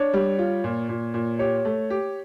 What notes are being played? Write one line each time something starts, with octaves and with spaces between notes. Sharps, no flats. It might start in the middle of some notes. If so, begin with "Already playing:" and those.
Already playing: D4 C#5
G3
F4
A#2
A#2
A#2
G4 C#5
A3
G4